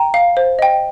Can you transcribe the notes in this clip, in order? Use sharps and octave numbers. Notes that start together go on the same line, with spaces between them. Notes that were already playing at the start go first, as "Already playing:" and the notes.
Already playing: G5 A#5
F5
C5
D#5 G5